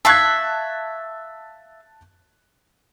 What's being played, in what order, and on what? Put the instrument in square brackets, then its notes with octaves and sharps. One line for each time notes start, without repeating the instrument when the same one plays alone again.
[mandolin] E5 F5 C#6 [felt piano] A5 F#6 G#6